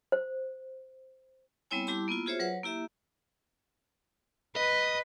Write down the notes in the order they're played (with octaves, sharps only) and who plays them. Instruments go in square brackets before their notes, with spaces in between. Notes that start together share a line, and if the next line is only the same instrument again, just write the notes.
[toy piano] C5
[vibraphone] G3 B3 C4 E4 C#5 G#5
G3 E4 G4 A5 C6 D6
A#3 B3 E4 F4
F4 F#4 G#4 C5 C#5 E5
F#3 B4 C#5 F#5
A#3 E4 G4 E5
[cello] B4 [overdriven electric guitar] D#5